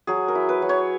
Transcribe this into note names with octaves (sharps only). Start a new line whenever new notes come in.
F#3 G#4
A#4
E4
B4
F#3
C#5